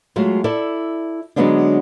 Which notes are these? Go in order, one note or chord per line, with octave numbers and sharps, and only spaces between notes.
F#3 G#3 A3 F4
E4 A4 D5 E5
D3 F#3 G#3 B3 C#4 D4